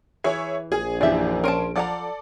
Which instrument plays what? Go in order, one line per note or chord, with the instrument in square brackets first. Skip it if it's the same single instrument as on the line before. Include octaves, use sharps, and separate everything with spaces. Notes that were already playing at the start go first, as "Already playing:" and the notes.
[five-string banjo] E3 [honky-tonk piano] G#4 C#5 E5
[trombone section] A#1 [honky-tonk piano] G#4
[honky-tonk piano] F#2 E3 G4 [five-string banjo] D5 E5
[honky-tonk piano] C#4 C6 D7 [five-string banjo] A#4 A5
[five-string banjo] F3 F#5 A#5 [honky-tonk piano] A4 D5